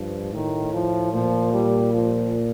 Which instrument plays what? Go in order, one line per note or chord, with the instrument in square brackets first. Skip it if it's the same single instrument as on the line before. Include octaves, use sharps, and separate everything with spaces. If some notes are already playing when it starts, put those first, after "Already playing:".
Already playing: [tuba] G2 [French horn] F3
[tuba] A2 [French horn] D#3
[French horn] F3
[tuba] A#2 [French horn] F3
[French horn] G3
F3